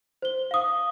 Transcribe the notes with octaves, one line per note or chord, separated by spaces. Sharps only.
C5 G7
F5 D#6